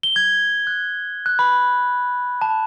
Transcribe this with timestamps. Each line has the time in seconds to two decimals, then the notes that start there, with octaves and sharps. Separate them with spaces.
0.03 G7
0.16 G#6
0.67 F#6
1.26 F#6
1.39 B5
2.42 A5